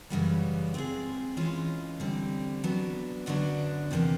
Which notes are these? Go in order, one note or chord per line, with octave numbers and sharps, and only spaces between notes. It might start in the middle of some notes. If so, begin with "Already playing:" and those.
F#2 C#3 E3 G3 B3
G#3 C4 F4 G#4
E3 G#3 C#4 F4
D3 G3 C4
F#3 B3 D4
F#2 D3 F#3 B3 D4
E2 C3 F3 A#3 D4